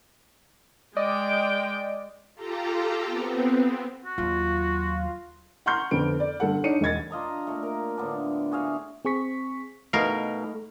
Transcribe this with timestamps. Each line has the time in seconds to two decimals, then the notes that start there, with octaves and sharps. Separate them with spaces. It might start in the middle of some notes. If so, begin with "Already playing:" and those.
0.97 G#3 D5 D#5 G5
2.35 F4 G4 A4 A#5
3.05 B3 C4
4.05 F#4
4.18 D#2 F#3 F4
5.66 F#5 A#5 C6 C#6 F6 G6
5.91 F2 D3 B3 A4 D7
6.20 D5
6.40 G1 A4 F#5
6.64 D4 D#4 C#5 C#7 D#7
6.81 E1 D#5 G#6 A6
7.11 D4 F4 D#5 A#5
7.47 A#2 A3
7.63 A#4
7.98 A2 D3 B3 D4
8.52 F#4 G#4 E5 F5
9.05 C4 G#4 C#6 B6
9.93 B2 A3 D#4 A#4 F5